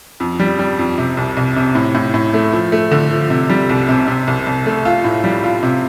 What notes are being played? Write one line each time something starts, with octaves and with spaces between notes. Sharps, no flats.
F2
G3
G3
F2
C3
C2
C2
C3
A2
A2
A2
A3
F3
A3
D3
F3
C3
G3
C2
C3
C3
C2
C2
A3
F4
A2
G3
F4
C3